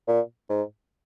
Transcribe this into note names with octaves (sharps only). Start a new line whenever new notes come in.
A#2
G#2